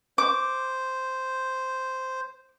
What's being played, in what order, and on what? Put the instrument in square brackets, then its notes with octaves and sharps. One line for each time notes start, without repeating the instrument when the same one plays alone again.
[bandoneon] C5 [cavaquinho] D6